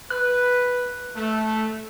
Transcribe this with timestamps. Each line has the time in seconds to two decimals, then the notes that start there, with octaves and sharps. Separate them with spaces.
0.10 B4 F#6
1.16 A3